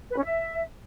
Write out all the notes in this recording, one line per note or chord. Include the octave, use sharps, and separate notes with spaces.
B4
C#4
E5